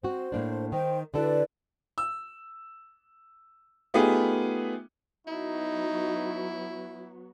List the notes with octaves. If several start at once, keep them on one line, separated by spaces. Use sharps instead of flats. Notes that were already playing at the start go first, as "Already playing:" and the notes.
C4 F#4 C5
A2 A#3 D4
D#3 D#4 C5 G5
D3 E4 F#4 A4 B4 D5
E6
A3 B3 D#4 F4 G4 G#4
F#3 B3 D#4 E4 F#4